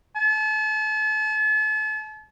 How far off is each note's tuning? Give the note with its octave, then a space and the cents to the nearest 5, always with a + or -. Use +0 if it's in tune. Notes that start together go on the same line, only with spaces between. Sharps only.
A5 -40